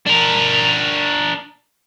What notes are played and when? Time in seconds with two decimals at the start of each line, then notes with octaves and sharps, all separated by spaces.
0.06 D4 A#4